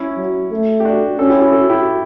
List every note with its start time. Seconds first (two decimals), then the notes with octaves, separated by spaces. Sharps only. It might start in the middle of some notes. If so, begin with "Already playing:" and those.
Already playing: C#4 E4
0.18 F#3
0.51 A3
0.80 G4
0.85 D4 F#4
1.19 C#4 F#4 A4
1.29 E4 G4
1.35 F#4
1.40 E4 G4
1.52 F#4 A4
1.69 E4 G4